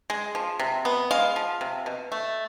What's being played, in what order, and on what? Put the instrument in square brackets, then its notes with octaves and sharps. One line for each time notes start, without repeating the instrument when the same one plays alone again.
[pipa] G#3
F3
C3
B3
G#3 F5
F3
C3
B2
A3